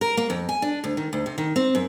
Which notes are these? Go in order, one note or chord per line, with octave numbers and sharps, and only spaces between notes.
A#4
A#3
F2
G#5
D4
D2
D#3
D2
C3
D#3
C4
F#2